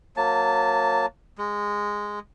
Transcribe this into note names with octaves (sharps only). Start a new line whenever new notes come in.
F#3 A#3 A5
G#3